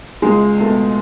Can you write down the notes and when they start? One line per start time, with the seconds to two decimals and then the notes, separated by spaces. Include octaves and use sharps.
0.22 C#2 G#3 G#4
0.58 B2 A3